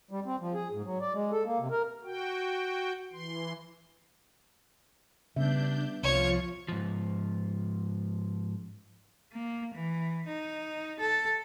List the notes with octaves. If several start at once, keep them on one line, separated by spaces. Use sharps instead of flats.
G3
C4
F3
G#4
G#2
F#3
D5
G#3
A4
A#3
C3
A#4
F#4 G5
E3 C6
C#3 G3 B3 D4 E5 G6
C2 F3 F4 C#5
G#2 F3
A#3
E3
D#4
A4